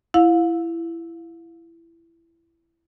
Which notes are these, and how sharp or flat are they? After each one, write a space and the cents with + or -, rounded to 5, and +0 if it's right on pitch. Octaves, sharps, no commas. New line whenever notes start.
E4 +15 F5 +30